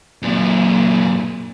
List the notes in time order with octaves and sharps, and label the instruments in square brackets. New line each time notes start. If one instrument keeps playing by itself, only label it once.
[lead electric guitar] F#2 A#2